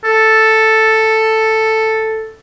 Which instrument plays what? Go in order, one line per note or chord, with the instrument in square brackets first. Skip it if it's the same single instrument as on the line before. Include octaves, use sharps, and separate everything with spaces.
[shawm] A4